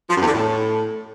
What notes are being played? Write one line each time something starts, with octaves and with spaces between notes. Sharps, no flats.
F3
F#2
E2
D3
A2